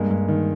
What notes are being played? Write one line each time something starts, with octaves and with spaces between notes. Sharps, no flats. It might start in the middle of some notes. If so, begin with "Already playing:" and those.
Already playing: G2 G#3 A#3
G2
D#3